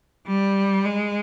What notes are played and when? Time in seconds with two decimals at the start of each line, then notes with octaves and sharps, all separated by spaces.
0.27 G3
0.85 G#3